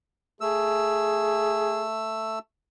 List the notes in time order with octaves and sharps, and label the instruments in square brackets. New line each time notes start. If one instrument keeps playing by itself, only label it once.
[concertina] A3 E6 [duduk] G#4